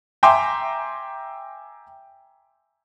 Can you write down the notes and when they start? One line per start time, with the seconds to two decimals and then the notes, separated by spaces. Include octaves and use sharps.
0.23 E5 G5 G#5 A#5 C6 D6